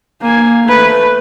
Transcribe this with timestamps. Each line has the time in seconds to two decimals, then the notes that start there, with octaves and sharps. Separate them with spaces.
0.22 A#3 G#5
0.65 A3 B4